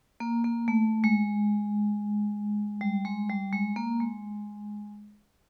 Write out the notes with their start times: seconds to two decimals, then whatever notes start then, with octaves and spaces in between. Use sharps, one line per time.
0.20 A#3
0.44 A#3
0.68 A3
1.04 G#3
2.81 G3
3.05 G#3
3.29 G3
3.53 G#3
3.76 A#3
4.00 G#3